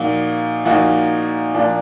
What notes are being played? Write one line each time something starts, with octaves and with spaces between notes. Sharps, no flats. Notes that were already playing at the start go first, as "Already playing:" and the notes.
Already playing: A#2 F3 A#3 D#4 F#4
A#2 F3 A#3 D#4 F#4
A#2 F3 A#3 D4 F4